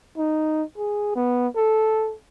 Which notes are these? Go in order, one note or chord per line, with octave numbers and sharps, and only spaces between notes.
D#4
G#4
B3
A4